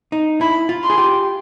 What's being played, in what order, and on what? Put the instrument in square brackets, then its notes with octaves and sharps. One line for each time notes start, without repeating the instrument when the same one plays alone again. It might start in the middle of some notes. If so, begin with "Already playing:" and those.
[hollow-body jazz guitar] D#4
[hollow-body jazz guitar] E4 [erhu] B5
[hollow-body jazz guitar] F4
[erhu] C6
[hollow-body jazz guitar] G#4
G4